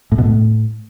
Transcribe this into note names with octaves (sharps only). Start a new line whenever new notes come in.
A2
B2
A2